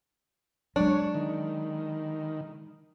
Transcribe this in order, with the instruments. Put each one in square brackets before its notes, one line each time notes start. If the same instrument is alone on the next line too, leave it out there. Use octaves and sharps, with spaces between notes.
[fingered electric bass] F#3 G#3 [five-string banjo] D4 [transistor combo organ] C#5
[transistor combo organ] D#3